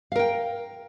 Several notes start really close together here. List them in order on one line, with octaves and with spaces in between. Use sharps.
F5 A#4 G5